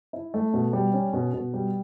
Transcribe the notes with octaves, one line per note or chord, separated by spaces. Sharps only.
E4
A3
B2
G3
C#4
B2
B2
G3